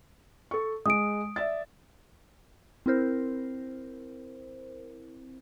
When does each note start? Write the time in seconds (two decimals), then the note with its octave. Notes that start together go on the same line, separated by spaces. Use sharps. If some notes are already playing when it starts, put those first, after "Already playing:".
0.51 A4 C#6
0.86 G#3 D#6 D7
1.36 D5 E5 A6
2.86 C4 E4 A#4 C5